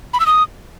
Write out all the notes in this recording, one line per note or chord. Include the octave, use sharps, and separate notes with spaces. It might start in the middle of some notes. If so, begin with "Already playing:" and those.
B5
E6
D#6